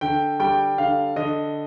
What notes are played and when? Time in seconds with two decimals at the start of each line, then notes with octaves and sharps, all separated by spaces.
0.01 D3 G5
0.40 G3 G5
0.78 D3 F5
1.16 D3 D#5